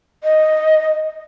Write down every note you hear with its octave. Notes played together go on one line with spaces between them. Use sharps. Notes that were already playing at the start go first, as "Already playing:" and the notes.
D#5